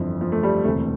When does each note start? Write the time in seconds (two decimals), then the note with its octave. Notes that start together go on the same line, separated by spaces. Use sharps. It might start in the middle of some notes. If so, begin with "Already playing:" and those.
Already playing: G1 F2 E3 F3
0.21 F3
0.32 A3
0.43 G3
0.64 E1 D2 C3 E3 A3